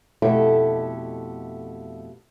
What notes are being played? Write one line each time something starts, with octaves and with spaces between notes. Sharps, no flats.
F2 B2 A3 E4 G4 A4